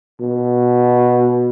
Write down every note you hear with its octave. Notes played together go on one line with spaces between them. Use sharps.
B2